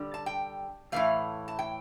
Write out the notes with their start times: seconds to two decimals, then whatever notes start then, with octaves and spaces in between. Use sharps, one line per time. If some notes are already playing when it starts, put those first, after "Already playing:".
Already playing: D3 G3
0.14 A5
0.26 G5
0.92 A2 E3 A3 F5
1.48 A5
1.59 G5